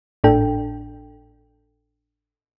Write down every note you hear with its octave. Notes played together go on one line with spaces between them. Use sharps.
G#1 A2 D4 A4 G5